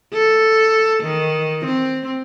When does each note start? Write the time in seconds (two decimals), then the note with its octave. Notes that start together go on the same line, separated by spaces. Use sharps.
0.13 A4
1.03 D#3
1.65 C4